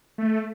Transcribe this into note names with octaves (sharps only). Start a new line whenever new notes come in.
A3